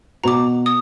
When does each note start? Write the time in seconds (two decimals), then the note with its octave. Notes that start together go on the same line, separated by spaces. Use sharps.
0.24 B2 F#4 A#5 D6
0.66 D#6